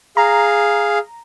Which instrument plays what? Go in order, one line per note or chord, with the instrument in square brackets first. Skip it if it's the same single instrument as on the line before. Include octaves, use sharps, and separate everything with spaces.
[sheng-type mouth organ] G#4 F5 [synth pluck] A#5